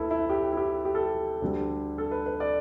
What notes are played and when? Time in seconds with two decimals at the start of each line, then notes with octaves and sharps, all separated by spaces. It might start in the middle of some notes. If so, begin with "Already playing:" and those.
Already playing: D2 E4 A4 B4
0.11 E4
0.30 G4
0.52 E4
0.57 G4
0.85 G4
0.95 A4
1.05 G4
1.42 D2 D3 G3
1.98 A4
2.11 B4
2.26 B4
2.40 D5